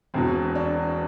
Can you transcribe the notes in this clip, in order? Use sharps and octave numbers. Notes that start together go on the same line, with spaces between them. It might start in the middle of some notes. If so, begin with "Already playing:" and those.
E1 E2 B2 C4
D4